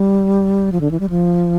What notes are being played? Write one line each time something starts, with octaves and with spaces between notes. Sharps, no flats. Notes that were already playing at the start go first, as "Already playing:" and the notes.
Already playing: G3
F3
D3
E3
G3
F3